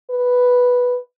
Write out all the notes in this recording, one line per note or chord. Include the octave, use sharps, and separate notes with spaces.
B4